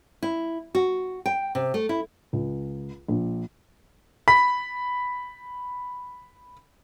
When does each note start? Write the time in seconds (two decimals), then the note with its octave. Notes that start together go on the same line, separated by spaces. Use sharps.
0.23 E4
0.75 F#4
1.26 G5
1.55 C3
1.74 A3
1.89 E4
2.33 C#2
3.08 A#1
4.28 B5 B6